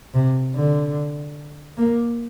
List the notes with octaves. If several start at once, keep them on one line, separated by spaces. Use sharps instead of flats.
C3
D3
A#3